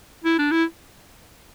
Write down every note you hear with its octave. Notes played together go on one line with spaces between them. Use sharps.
E4
D4
E4